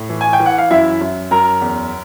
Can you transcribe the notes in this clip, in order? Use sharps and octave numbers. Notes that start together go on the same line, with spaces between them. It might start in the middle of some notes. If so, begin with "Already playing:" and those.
Already playing: A2
E3
G#5
G5
E3
F#5
F5
F#2 E4 E5
F#2
F#2 A#4 A#5
E2